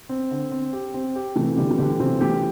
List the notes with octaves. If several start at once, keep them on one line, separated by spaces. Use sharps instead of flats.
C4
D3
C4
G4
C4
G4
C3 E3 A3
D3 G3 G4
E3
D3 G4
C3 E3 C4
E3 A3 G4